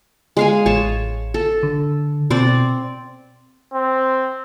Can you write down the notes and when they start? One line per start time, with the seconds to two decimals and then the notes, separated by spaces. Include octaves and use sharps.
0.37 G#3 F5 G#5
0.66 A1 C#5 A5
1.34 A4
1.63 D3
2.30 B2 C4 D5
3.74 C4